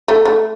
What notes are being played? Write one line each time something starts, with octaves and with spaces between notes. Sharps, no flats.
A3
A3